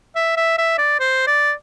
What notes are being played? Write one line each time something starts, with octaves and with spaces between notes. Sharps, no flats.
E5
E5
E5
D5
C5
D5